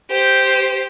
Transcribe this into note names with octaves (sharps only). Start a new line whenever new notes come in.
G4 C5